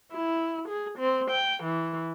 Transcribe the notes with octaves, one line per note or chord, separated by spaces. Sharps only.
E4
G#4
C4
G5
E3